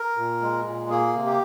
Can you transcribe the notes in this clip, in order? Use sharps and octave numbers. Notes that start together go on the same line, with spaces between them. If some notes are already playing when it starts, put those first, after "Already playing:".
Already playing: A#4
A#2
G#3
A#2
A#3 G#4
C3
G4